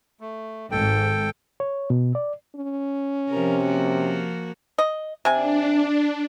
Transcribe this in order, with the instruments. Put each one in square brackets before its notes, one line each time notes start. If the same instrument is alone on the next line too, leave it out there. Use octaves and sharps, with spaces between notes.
[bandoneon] A3
[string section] G#1 G#2 [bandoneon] A4 G5
[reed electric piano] C#5
B2
D5
[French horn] C#4
[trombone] C3 [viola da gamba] F3 A#4
[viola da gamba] F3 A#3 F#4
[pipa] D#5
[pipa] C3 G#5 [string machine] D4